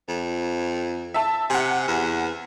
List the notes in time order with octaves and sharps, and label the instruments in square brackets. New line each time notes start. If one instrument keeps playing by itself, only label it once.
[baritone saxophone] F2
[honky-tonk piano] E5 A5
[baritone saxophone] C3 [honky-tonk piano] F#5 G#5
[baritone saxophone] E2